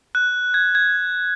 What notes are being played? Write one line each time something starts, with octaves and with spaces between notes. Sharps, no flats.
F#6
G#6
G#6